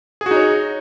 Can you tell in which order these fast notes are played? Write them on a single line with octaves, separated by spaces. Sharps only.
G#4 F#4 D#4 C#5